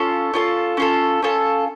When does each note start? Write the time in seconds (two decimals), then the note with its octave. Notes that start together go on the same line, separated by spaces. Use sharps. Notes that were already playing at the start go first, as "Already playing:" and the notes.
Already playing: C#4 F4 A4
0.34 C#4 F4 A4
0.77 C#4 F4 A4
1.22 C#4 F4 A4